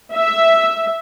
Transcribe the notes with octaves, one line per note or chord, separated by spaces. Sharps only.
E5